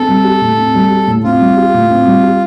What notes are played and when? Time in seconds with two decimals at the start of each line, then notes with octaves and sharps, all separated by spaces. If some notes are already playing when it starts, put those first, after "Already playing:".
Already playing: C4 A4
0.09 G3
0.24 G4
0.41 A2
0.57 C4
0.75 G3
0.90 G4
1.07 A2
1.24 C4 F4
1.40 G3
1.57 G4
1.74 A2
1.90 C4
2.06 G3
2.23 G4